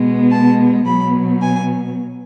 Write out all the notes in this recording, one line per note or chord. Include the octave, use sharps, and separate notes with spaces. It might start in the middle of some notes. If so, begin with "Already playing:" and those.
Already playing: B2 G#3 B3
A5
B2 F#3 B3 B5
G#5